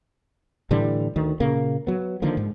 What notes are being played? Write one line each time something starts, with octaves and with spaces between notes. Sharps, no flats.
A2 D3 E3 G3
D2 D#3
A#2 C#3 A#3
F#3 B3
D3 D#3 F3 A#3
G#2